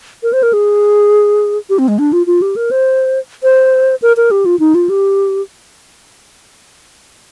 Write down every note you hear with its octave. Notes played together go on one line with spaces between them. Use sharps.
A#4
C5
A#4
G#4
G4
C4
G#3
D4
F4
F4
G4
A#4
C5
C5
A#4
A#4
G4
F4
D#4
F4
G4